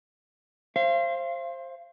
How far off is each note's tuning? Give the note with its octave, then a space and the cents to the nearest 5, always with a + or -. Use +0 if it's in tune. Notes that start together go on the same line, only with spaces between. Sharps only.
C5 +20 F5 -35